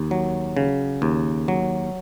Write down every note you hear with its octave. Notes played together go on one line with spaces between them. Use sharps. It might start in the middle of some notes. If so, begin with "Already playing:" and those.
Already playing: D#2
F#3
C#3
D#2
F#3